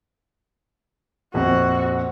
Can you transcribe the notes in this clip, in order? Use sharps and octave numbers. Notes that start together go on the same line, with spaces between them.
A#1 F2 F#4